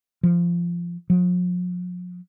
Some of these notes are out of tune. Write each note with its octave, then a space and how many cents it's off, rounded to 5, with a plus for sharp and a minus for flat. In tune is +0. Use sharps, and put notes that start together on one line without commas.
F3 -15
F3 +45